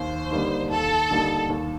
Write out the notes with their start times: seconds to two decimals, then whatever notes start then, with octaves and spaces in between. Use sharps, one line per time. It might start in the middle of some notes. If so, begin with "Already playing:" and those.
Already playing: D#2 C5
0.30 D3 G3 A#3 D#4
0.70 D#2 A4
1.10 D3 G3 A#3 D#4
1.49 D#2